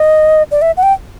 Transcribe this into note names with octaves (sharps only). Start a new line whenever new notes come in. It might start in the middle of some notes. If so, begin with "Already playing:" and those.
Already playing: D#5
D5
E5
F#5
G5